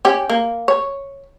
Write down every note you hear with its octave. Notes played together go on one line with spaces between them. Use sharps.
C#4 G4
A#3
C#5